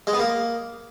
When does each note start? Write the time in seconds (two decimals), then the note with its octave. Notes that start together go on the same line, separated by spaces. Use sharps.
0.07 G#3
0.13 B3
0.19 A#3